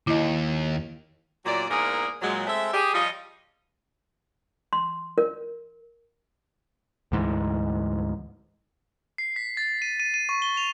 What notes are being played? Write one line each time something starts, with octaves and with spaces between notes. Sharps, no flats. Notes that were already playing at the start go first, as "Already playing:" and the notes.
D#2 E4 D#5
E2 A#2 F#3 D5
E2 G#2 A#3 G#4 A#4 D5
A#2 F#3 G#3
G#3 A3 C4 E5
G4 G#4
F3 G3 F4 C#5 D#5
C6
A#4
D2 G#2 E3
C7
B6
A6
D#7
D#7
D#7
C#6
G7
F7